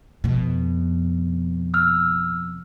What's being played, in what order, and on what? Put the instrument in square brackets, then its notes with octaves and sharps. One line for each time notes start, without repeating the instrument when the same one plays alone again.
[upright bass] F2 B2
[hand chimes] E6 F6